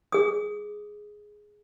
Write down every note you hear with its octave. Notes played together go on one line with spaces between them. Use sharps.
G#4 D#6